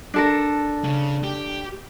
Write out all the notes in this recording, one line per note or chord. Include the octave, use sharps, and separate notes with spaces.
D4 A4 A#4
C#3
G4